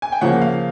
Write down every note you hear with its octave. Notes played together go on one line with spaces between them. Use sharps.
G#5
G5
C#3 F3 A#3 F#5
F5